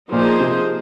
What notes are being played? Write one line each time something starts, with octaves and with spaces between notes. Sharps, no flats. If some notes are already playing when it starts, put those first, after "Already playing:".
A#2 F3 A#3 D#4 G#4 C5
C3